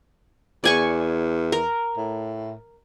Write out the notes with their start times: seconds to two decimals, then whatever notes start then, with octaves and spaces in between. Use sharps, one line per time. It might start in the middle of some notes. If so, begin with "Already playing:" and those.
0.64 E2 D5 G#5 C#6
1.52 A#4
1.97 A2